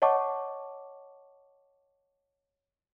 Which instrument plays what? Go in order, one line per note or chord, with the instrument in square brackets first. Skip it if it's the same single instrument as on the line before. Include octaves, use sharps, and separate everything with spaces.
[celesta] C#5 D#5 F#5 A5 C#6 D6